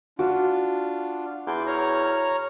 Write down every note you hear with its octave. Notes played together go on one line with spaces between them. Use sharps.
D4 F4 F#4
E2 C6 D6
C#5 A#5 F6